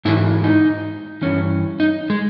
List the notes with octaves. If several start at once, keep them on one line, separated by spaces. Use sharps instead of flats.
G#2 E3 E4
D#4
G2 E3 C#4
D#4
G#3